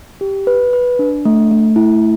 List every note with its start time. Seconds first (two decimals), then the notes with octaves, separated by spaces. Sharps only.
0.21 G4
0.47 B4
0.73 B4
0.99 D4
1.25 A3
1.51 A3
1.76 E4